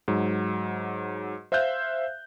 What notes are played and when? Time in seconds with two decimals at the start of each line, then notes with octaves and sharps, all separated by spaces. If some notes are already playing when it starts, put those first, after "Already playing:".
0.08 G#2 F#3
1.52 C5 E5 F5 F#6 G6